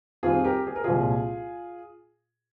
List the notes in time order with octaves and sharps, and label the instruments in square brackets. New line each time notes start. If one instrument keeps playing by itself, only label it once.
[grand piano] F2 D#3 G3 C4 F4 G#4
G4 A#4
G#4
A#4
C2 A#2 F3 G#3 C4 F4 G#4